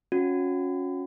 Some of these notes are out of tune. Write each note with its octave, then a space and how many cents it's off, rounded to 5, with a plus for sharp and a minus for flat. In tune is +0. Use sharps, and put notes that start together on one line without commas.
C#4 +0 F#4 -35